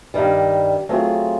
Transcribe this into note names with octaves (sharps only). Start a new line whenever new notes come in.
G2 D#3 G3
F#3 A3 C4 F4 G#4